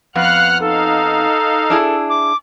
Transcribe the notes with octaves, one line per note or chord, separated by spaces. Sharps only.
F2 B3 F5 F#5 F6 F#6
D#4 A4 F5
D4 E4 G#4
D6